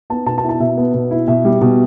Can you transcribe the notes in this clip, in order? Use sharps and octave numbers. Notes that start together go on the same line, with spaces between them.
B3 A5
B2 A5
A5
E4
A5
B2 E5
B3
B2
E4
B2 E5
G3
B2